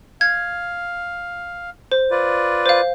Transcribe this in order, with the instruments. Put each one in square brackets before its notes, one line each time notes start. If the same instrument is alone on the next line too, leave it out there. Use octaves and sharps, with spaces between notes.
[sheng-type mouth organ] F5 [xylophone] G#6
[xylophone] C5
[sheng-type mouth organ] F4 B4 D5
[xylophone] C5 F5